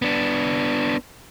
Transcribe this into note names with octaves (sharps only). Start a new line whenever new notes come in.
B3 D4